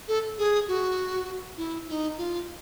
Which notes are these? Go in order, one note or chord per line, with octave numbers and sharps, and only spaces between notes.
A4
G#4
F#4
E4
E4
D#4
F4